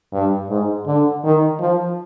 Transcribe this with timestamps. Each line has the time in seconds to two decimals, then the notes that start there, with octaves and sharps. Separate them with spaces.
0.13 G2
0.50 G#2
0.87 D3
1.23 D#3
1.59 F3